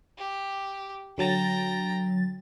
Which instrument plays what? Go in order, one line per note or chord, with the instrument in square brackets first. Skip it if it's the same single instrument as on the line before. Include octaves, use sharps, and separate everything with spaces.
[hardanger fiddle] G4
[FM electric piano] D3 F#3 A6 [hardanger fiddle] G5 A#5